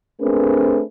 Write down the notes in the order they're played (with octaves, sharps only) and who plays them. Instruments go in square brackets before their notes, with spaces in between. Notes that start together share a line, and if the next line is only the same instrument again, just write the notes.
[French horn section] A3 C4 D4 G#4 A#4 B4